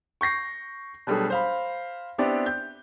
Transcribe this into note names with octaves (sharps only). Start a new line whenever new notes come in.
C#6 G6 A#6 C7
B2 F#3 G3 A3 D4 G#4
C5 F5 B5
B3 C4 D4 E4 G4 D5
G6